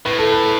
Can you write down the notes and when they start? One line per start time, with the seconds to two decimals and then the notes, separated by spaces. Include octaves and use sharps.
0.05 A2 B4
0.18 A4
0.32 B4